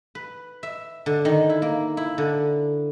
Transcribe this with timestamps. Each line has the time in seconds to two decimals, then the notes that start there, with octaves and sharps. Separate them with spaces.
0.15 B4
0.63 E5
1.06 D3
1.25 D#3
1.50 E4
1.62 A#3
1.97 E4
2.18 D3